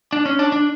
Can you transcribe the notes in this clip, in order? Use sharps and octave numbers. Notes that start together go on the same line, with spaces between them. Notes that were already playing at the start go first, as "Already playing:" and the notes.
D4
C#4
D4
D4